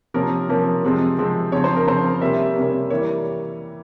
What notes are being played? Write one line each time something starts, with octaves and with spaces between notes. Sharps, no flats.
C3 F3 A#3 C#4 A#4
C3 F3 A#3 C#4
C3 F3 G#3 C4
C3 F3 G#3 C4
C#3 F3 C4 C#5
C5
A#4
C#3 F3 C4 C5
C3 G3 A#3 C#4 E5
C3 G3 A#3 C#4
E3 G3 A#3 C#5